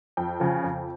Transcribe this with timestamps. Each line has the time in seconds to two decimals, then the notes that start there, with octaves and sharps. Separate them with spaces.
0.17 F2 G5
0.40 C#3 F3
0.64 F2